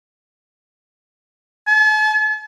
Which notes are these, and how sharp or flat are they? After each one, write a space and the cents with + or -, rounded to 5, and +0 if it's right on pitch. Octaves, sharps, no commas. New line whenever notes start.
A5 -45